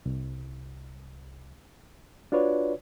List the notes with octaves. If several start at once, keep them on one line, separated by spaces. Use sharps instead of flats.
C2
D4 F4 F#4 B4 C#5 D5